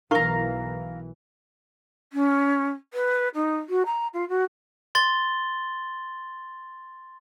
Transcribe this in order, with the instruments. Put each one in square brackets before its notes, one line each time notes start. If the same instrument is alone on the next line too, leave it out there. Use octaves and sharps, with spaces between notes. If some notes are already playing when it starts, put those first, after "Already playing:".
[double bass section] B1 E3 [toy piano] E4 A#4 C#6 [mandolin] F5 A#5
[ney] C#4
B4
D#4
F#4
A#5
F4
F#4
[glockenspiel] C6 A6 G7